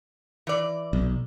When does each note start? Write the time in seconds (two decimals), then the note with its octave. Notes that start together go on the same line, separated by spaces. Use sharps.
0.47 E3 D5
0.93 B1